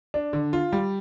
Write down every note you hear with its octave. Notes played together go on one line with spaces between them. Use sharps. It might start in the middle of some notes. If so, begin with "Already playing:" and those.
D4
D3
F4
G3